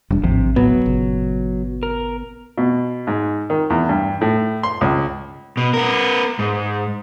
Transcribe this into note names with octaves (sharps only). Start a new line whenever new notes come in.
E1 G3 G#3 D4
A1 G#2 C3 D#3 F3
D1 A2 F#3 B3
G#1 A#2 C#3
A#4
B2
G#2
D#3
E2
G2
A2
C6
C#2
B2
B3 A#4
G#2